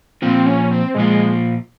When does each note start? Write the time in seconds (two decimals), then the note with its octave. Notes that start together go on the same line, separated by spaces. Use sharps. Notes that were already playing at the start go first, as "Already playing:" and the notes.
0.22 A#2 F3 A#3 C4 F4
0.46 C#4
0.71 C4
0.95 A#2 F3 G#3 A#3 F4